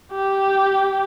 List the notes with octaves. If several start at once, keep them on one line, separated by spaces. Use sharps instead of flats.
G4